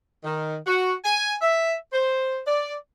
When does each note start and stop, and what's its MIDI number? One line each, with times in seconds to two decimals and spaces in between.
0.24 0.56 51
0.67 0.93 66
1.05 1.35 80
1.42 1.74 76
1.93 2.40 72
2.47 2.75 74